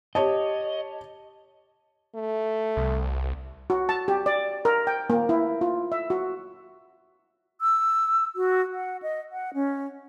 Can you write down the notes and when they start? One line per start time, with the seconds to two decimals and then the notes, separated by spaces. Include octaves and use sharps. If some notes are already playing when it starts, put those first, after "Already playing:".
0.15 G4 C#5 D#5 A5
2.15 A3
2.77 C2
3.70 F#4
3.89 A5
4.08 G4
4.26 D5
4.65 A#4
4.87 G5
5.10 A#3
5.29 E4
5.61 F4
5.92 E5
6.10 F#4
7.61 E6
8.36 F#4
8.73 F#5
9.02 D#5
9.32 F#5
9.54 C#4